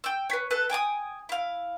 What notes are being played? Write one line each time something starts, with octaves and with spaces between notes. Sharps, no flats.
G5 E6
B4 C#5
A4 B4 F#6
G5 G#5 D6 D#6
E4 F5